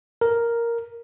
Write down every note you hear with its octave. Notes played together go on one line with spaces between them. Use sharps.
A#4